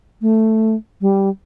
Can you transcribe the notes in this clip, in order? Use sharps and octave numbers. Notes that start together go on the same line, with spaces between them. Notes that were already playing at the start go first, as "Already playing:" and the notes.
A3
G3